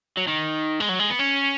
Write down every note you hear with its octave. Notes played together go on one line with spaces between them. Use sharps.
F#3
D#3
G#3
F#3
G#3
B3
C#4